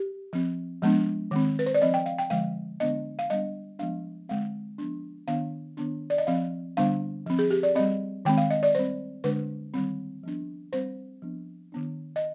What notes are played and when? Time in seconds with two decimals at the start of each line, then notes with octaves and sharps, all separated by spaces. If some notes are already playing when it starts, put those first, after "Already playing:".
Already playing: G4
0.33 F3 C4
0.82 F3 G#3 B3 D4
1.31 D#3 G#3 C4
1.59 B4
1.66 C5
1.74 D5
1.82 F3 C4 D#5
1.94 G5
2.06 F5
2.19 G5
2.30 D3 F3 G#3 F5
2.80 D3 G#3 B3 D4 D#5
3.19 F5
3.30 G3 B3 D4 D#5
3.79 F3 G#3 B3 D4 F5
4.29 D3 G#3 C4 F5
4.78 F3 B3 D4
5.28 D#3 B3 D4 F5
5.77 D#3 B3 D4
6.10 D5
6.18 D#5
6.27 F3 C4 F5
6.77 D3 G3 B3 D4 F5
7.26 F3 C4
7.39 G#4
7.51 G4
7.63 D5
7.76 G3 C4 D#5
8.25 D#3 G#3 C4 G5
8.38 F5
8.50 D#5
8.63 D5
8.75 G3 C4 C5
9.24 D3 G#3 D4 B4
9.74 D#3 G3 C4
10.24 F3 B3 D4
10.73 G3 C4 C5
11.22 F3 B3 D4
11.72 D#3 B3 D4
12.16 D#5